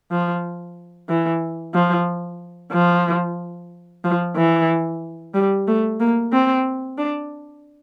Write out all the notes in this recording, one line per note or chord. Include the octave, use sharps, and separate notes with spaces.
F3
E3
F3
F3
F3
E3
G3
A3
A#3
C4
D4